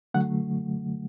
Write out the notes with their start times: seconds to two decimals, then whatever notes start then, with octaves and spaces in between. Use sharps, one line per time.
0.14 D3 F#3 A3 F#5